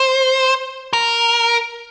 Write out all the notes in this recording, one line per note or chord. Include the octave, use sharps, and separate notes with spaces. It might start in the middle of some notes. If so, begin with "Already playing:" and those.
Already playing: C5
A#4